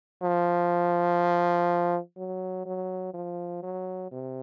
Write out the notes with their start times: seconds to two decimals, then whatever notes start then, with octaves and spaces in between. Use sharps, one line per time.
0.23 F3
2.17 F#3
2.66 F#3
3.14 F3
3.63 F#3
4.11 C3